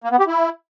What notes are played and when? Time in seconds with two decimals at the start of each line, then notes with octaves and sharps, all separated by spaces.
0.04 A#3
0.12 B3
0.20 G4
0.27 E4